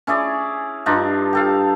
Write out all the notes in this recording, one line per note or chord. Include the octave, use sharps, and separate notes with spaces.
C#4 E4 G#4 D5
G2 D4 D#4 F4
G4 A4 F5